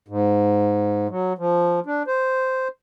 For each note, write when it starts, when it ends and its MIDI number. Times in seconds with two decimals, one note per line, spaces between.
0.08 1.07 44
1.09 1.33 54
1.38 1.80 53
1.86 2.03 62
2.07 2.68 72